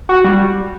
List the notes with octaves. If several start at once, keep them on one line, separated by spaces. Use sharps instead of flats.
F#4
G3